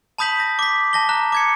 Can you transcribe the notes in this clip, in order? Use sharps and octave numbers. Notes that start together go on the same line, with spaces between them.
A5 B5 D#6 G6 B6 F#7
A#6
D6 B6
A5 A#6 G7
A#5 F#6
D6 G#6 C#7